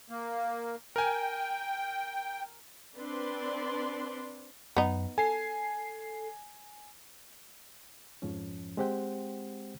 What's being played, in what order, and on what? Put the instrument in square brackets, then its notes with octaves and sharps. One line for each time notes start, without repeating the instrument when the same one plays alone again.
[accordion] A#3
[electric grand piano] A#4 G#5 [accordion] G5
[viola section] C4 D4 B4 D5 C6
[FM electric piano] F#2 [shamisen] B3 D#4
[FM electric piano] A4 C7 [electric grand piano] G#5
[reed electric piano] F2 G#2 F3 C#4
G#3 C4 G4 C5 F#5 G5